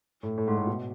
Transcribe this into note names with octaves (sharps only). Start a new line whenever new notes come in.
A2
A2
G#2
A2
B2